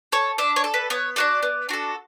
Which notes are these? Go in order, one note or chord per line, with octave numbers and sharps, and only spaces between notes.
A4 C#5
D4 E5
C#5
A4
B4
B3 C#5
D4 F#4 A4 D5
B3
D4 F#4 A4